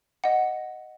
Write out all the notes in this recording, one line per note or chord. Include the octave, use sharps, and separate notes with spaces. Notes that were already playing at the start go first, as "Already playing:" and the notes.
D#5 F#5